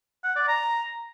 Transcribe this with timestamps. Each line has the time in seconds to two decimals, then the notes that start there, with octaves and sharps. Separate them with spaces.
0.24 F#5
0.36 D5
0.48 A#5